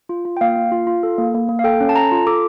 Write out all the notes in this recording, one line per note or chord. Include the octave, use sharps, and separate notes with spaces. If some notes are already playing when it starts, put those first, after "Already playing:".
F4
F4
G5
A#3 F5
A#3
F4
F4
A4
A#3
A#3
A#3
F5
A4 G5
C#4
A5
A4 A#5
F4
A4 D6